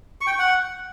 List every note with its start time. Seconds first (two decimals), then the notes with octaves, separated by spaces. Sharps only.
0.21 C#6
0.27 G5
0.33 C#6
0.39 F#5